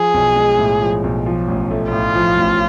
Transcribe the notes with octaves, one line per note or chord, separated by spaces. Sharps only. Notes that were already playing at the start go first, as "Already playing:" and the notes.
Already playing: F3 G#4
B1
G#3
A2
F3
B1
F3
A1
A3
A2 F4
F3
A1